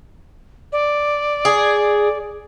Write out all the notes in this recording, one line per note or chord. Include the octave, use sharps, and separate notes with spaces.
D5
G#4